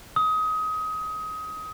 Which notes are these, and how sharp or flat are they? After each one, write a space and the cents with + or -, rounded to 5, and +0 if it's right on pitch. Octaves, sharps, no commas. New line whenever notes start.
D#6 +25